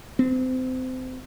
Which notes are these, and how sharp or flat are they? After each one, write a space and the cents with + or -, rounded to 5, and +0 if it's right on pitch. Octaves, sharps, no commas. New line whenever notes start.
C4 -30